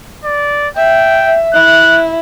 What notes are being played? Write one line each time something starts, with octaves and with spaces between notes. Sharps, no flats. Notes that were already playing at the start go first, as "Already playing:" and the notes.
D5
E5 G5
E4 F#6